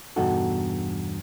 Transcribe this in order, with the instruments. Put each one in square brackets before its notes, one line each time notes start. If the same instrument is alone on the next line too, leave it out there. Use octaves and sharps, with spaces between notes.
[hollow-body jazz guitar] E2 G2 B2 D#4 F#4 A4